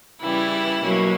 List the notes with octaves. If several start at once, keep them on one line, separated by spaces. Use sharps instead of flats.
C#3 E3 G3 E4
B2 F#3 A#3 C#4